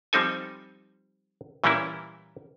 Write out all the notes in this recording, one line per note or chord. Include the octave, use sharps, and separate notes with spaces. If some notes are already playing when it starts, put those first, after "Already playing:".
F3 G3 C4 D#4 A4 G#5
A#2 E3 G3 A#3 C#4 E4